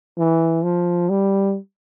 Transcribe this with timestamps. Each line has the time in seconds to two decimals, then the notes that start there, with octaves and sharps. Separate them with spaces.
0.18 E3
0.64 F3
1.09 G3